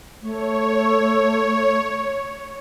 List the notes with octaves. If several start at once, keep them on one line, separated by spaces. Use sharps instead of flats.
A3 C#5